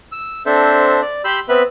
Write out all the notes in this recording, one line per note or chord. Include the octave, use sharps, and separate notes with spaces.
E6
C4 D4 A4 C5 E5
D5
G4 B5 C6 E6 G6
B3 C4 B4 E5 B5